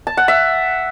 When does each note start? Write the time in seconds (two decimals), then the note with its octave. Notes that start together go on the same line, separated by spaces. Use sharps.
0.07 A5
0.17 F#5
0.28 E5